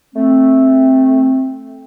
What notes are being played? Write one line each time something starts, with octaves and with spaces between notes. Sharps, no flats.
A3 C4